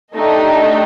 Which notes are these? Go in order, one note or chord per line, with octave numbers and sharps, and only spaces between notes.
A3 D4 D#4 G4 D#5